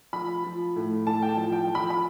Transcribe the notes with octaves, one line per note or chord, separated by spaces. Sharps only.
F3 B5
F3
A2
A2 A5
G5
A5
F3
G5
F3
B5
B5